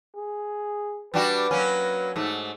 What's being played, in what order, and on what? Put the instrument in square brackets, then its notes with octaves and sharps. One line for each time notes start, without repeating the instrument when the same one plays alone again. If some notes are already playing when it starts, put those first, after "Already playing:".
[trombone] G#4
[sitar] G3 D4 F#4 [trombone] B4
[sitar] F#3 A#3 C#4
G#2 A3